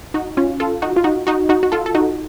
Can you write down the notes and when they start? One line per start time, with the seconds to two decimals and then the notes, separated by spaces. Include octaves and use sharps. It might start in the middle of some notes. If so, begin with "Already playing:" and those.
0.14 D#4 F#4
0.37 C#4 F4
0.60 F4 A4
0.82 D#4 F#4
0.96 F4
1.04 D#4 F#4
1.27 D#4 F#4
1.49 D#4 F#4
1.63 F#4
1.72 F4 A4
1.86 A4
1.95 D#4 F#4